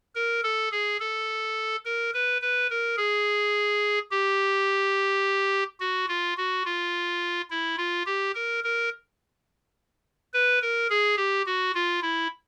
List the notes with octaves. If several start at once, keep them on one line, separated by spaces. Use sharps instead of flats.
A#4
A4
G#4
A4
A#4
B4
B4
A#4
G#4
G4
F#4
F4
F#4
F4
E4
F4
G4
A#4
A#4
B4
A#4
G#4
G4
F#4
F4
E4